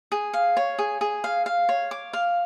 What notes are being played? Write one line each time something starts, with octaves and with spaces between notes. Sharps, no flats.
G#4
F5
C#5
G#4
G#4
F5
F5
C#5
D6
F5